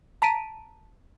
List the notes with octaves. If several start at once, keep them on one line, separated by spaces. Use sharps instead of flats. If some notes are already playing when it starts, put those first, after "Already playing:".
A5 A#5 B6 D7 D#7